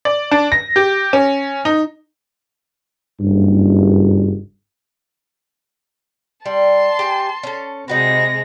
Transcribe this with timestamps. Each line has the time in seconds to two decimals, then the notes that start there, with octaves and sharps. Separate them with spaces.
0.05 D5
0.32 D4
0.52 A#6
0.76 G4
1.13 C#4
1.65 D#4
3.20 F#1 G2
6.46 G3 A5 C6
6.99 G4 G#5
7.43 C#4 A4
7.88 C3 G#3 D#4 F#4 B4 A#6